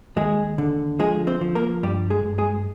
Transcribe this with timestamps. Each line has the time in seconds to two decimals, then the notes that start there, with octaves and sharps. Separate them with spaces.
0.16 D#2 G#3 G#4
0.58 D3
0.99 F3 G#3 G#4
1.27 C4 C5
1.41 F3
1.55 A#3 A#4
1.83 G2 G3 G4
2.10 G#3 G#4
2.25 G2
2.38 G#3 G#4